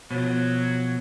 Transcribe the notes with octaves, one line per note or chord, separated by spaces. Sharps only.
B2 F3 F#3